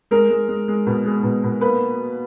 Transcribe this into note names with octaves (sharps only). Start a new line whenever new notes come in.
G#3 A#4
G#3
G#3
G#3
B2
G#3
B2
B2
A#3 B4